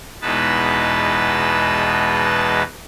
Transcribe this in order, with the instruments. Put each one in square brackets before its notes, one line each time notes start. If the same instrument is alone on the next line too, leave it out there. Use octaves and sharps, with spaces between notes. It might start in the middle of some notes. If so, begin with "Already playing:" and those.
[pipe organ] E2 B2 G#3 D#4 B4 A5